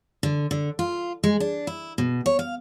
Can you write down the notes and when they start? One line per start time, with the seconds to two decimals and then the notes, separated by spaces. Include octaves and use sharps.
0.23 D3
0.51 D3
0.79 F4
1.24 G#3
1.40 D4
1.67 E4
1.98 B2
2.26 C#5
2.39 F5